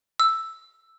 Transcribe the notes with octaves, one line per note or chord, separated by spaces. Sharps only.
E6